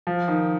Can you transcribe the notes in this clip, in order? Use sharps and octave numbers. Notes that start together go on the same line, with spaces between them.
F3
D#3